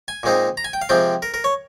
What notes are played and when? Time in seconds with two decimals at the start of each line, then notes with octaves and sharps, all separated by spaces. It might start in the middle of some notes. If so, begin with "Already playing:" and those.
0.08 G#5
0.23 A#2 G#3 C4 D#4
0.57 A#5
0.64 G#5
0.73 G5
0.82 F5
0.89 C3 F3 G#3 C4 G5
1.22 A#4
1.34 A#4
1.44 C#5